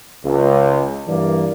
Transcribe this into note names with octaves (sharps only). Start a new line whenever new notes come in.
C#2
G2 E3 A#3 D5